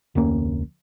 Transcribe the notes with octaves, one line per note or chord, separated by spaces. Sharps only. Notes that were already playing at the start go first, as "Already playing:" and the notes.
F1 D2 A#3 C#4